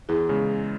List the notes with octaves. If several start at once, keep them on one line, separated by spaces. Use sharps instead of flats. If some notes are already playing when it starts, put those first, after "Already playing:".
E2 E4 G#4
C#3 G#3